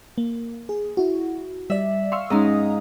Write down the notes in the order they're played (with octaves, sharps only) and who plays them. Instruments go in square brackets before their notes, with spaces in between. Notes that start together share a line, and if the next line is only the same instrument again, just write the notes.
[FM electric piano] A#3
G#4
E4 F#4
[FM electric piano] G3 D5 [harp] E5
[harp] F5 [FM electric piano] C6 C#6 E6
[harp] G#2 D#4 [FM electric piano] C#4 A#5 D#6